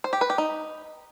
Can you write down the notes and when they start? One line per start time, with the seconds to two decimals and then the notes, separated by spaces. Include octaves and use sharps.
0.04 C5
0.13 G4
0.21 B4
0.30 G4
0.38 D#4